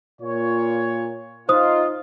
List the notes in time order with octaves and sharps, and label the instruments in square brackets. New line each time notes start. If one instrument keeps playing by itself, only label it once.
[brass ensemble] A#2 F4 C#5
[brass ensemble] D#4 F4 [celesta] C5 D#6